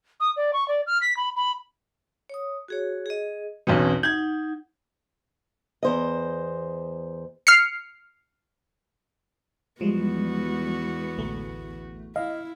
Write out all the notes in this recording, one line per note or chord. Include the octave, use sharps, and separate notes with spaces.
D#6
D5
C#6
D5
F6
B6
B5
B5
C#5 D#6
F#4 G#4 C#5
G#4 D#5
B1 E2 B2 C4 C#4 B4
D#4 F#5 G6 G#6
E2 C5 D#5
F6 C7 C#7
E2 F3 G3 G#3 B3 F#4
A1 D2 A3
E4 D#5 F5